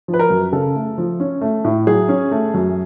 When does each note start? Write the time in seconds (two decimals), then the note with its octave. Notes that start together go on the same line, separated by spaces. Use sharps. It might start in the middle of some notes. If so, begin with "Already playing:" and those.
0.08 F3
0.13 B4
0.19 A#4
0.30 F#2
0.52 C#3 A4
0.75 A3
0.98 F3
1.20 C#4
1.41 A3
1.65 A2
1.87 F#3 G#4
2.09 C#4
2.31 A3
2.54 F#2